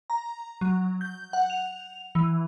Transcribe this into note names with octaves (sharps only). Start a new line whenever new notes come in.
A#5
F#3
G6
F#5
F7
E3